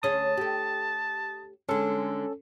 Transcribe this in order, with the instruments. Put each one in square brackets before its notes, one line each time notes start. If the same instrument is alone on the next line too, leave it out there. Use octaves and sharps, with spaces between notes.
[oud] D2 C#4 G#4 [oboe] A5 [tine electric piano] D#6
[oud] G4 A4
[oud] D3 G#3 [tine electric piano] C#4 A4